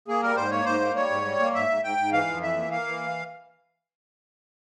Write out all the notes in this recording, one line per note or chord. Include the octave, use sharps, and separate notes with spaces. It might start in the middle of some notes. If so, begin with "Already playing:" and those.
A#3 G#4
G3 A#4
G#2 C5
A#3 C#5
G#2 C5
A#3
G3 C#5
G#2
G3
A#3
G#2 E5
G#2
G#2 G5
G#2
E3 F5
F2
E3 E5
A#3
A#3 F5
E3